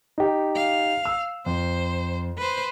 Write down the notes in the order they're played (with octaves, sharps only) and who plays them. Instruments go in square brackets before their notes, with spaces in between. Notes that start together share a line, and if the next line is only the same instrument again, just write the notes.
[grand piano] D#4 G4
[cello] F5
[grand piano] E6
[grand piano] F2 [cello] C5
[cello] B4 C5